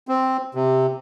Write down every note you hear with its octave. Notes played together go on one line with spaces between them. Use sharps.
C4
C3